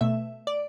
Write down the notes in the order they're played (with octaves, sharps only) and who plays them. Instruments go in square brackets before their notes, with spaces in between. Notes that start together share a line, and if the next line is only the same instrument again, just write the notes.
[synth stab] B2 A3 E5
D5